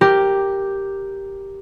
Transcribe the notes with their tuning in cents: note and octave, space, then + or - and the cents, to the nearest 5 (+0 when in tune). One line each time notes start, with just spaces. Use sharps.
G4 +0 A#4 +0